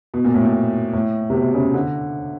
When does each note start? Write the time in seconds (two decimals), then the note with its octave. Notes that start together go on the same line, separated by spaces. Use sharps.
0.14 B2
0.24 A#2
0.34 A2
0.45 A#2
0.93 A2
1.30 C3
1.35 B2
1.54 C#3
1.74 D3